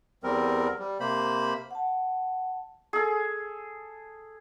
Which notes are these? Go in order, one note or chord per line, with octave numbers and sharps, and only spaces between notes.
E2 G3 C4 A#4
G3
C3 A#3 C5 B5
F#5 A5
G#4 A4